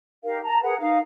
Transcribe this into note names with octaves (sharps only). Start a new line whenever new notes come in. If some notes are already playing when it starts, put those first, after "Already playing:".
D#4 G4 A#4 F5
A5 A#5
G#4 A#4 B4 F#5
D#4 F5